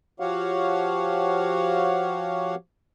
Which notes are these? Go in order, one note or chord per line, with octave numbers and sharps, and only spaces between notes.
F3 F#4 G4 C#5 F5 F#5